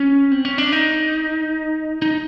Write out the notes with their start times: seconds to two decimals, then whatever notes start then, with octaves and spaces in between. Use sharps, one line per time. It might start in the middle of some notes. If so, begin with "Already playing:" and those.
Already playing: C#4
0.32 C4
0.45 C#4
0.58 D4
0.72 D#4
2.02 D#4